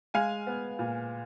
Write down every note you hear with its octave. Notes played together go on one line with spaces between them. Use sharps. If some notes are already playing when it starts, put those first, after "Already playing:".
G#3 F5 G#5
B3
A#2